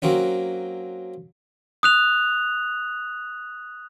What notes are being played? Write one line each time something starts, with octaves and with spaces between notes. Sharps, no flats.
F#3 A#3 C4 C#4
D#6 F#6 F7